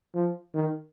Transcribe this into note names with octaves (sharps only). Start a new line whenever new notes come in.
F3
D#3